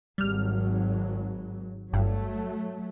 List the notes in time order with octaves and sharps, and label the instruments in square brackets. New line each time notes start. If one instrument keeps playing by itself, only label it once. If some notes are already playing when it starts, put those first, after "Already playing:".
[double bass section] G#1 F#3 [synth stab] G3 F6
[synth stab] G1 G2 [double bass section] F#3 A3